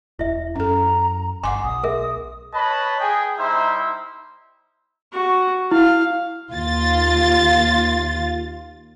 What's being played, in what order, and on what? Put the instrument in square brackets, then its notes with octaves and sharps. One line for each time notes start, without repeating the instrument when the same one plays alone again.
[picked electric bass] E1 [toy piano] E4 E5
[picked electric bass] F#2 [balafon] C#4 A4 [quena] A#5
[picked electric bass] G1 [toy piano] F#5 C6 [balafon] G#5 D6
[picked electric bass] B1 [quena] D#6
[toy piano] G#4 A#4 E5
[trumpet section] B4 C#5 D#5 A5 B5
G#4 G5
G3 D#4 E4 C5 E5 C6
[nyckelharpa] F#4
[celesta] E4 [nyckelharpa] F5
[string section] D#2 F4 A6